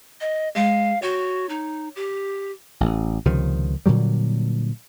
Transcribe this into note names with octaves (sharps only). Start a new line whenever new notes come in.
D#5
G#3 F5
F#4 C#5 G5
D#4
G4
A1
C#2 C3 D#3 F3
A#2 D3 F#3 G3